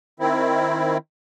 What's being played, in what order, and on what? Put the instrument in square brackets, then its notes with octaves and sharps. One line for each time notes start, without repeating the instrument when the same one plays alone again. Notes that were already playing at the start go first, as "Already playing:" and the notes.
[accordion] D#3 C4 E4